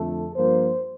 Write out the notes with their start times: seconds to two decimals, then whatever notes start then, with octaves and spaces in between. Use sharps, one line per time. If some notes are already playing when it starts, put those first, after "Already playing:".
Already playing: F2 D3 A3 A4
0.35 G2 F3 A#3 C5